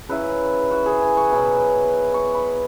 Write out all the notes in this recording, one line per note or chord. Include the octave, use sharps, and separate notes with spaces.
C#3 F#3 E4 B4
F#4
G#4
G#5
C#6
B2 F#3 E4 B5
C#6
B5